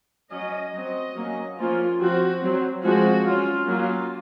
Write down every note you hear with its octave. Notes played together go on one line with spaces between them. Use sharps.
F#3 C#4 D#5
F#3 C4 D#5
F#3 A#3 C#4
F3 A#3 C#4 F4
F3 C4 F#4
F#3 C4
F3 G#3 C4 F#4
F#3 C#4 F4
F#3 A#3 C#4 F4